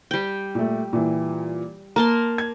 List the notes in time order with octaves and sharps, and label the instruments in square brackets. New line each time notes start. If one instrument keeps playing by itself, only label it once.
[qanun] G3 G5
[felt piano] A#2 A3
A#2 E3
[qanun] A#3 A5 C6 [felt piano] A#5
[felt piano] G#6